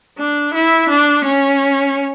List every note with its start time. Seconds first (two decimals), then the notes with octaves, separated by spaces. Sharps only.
0.19 D4
0.54 E4
0.90 D4
1.25 C#4